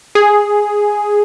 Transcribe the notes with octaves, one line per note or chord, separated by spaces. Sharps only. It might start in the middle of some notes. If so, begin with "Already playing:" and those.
G#4